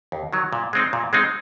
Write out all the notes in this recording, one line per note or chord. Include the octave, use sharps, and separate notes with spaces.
D#2
D#3 F#3
A#2
G#3 C4 D#4
A#2
G#3 C4 D#4